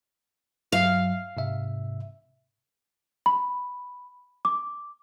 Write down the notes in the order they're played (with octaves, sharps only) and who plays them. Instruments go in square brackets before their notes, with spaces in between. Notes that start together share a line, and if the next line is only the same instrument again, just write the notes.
[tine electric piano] G2 F#3 E5 [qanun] F5
[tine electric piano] G#2 C3 E5
[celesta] B5
D6